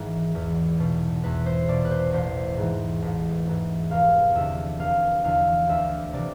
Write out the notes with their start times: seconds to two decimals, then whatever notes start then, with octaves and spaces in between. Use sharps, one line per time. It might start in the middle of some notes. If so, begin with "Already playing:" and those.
Already playing: G#1 G#2 E3
0.35 E2
0.80 B2
1.24 E2 B4
1.46 C5
1.69 B2 D5
1.85 B4
1.91 C5
2.13 A1 C5
2.57 G#2 E3
3.02 A1
3.47 G#2 E3
3.90 F1 F5
4.35 E2 D3 E5
4.79 F1 F5
5.24 E2 D3 F5
5.69 D2 E5
6.13 C3 E3 D5